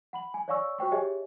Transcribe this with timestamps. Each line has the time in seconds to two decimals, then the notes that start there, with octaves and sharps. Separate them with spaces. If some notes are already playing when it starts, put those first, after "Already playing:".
0.13 F#5 B5 F#7
0.34 G#5
0.48 C#5 D5 F5 G#5 C#6 E6
0.78 F#4 C5 G5 C#6
0.92 G4 G#4 C#5 D#5 E5 G#5